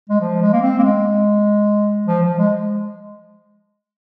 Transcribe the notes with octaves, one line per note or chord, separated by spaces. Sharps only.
G#3
F3
G#3
A#3
C4
A#3
G#3
F3
F3
G#3